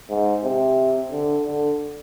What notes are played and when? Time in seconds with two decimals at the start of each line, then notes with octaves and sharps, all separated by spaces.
0.09 G#2
0.44 C3
1.11 D3
1.46 D3